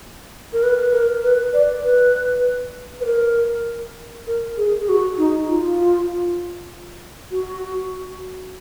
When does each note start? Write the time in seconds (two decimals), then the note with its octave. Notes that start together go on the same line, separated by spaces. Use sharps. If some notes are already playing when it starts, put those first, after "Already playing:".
0.53 A#4
0.63 B4
0.92 A#4
1.23 B4
1.54 D5
1.84 B4
3.01 B4
3.05 A#4
4.27 A#4
4.57 G#4
4.80 G#4
4.89 F#4
5.18 D#4
5.48 F4
7.31 F#4